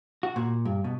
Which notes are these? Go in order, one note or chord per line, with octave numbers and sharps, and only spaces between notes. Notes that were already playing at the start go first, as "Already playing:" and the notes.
F#4
A#2
G2
B2